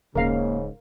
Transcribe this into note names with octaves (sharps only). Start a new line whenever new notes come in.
D#1 G#2 C#3 A#3 A#4 F5